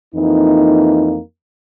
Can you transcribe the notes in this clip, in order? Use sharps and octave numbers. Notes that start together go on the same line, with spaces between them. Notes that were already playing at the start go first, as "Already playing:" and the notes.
F2 E3 A#3 D#4